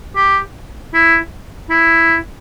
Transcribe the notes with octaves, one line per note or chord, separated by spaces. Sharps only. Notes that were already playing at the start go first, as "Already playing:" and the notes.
G4
E4
E4